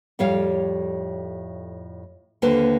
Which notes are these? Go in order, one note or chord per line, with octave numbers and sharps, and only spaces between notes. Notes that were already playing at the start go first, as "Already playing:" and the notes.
F2 A2 G3 C#5 F5
D#2 D3 A#3 B4 C5